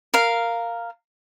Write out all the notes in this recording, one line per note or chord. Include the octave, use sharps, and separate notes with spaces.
A#4 F5